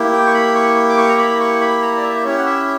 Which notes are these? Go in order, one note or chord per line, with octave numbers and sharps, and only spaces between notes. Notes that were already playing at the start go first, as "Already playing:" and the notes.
Already playing: A#3 E4 G4
G5
C#6
B5
C#6
D6
C#6
A#5
B5
C#6
B5
A#5
D5
E5
C#4 E4 G4 C#5
F#5
E5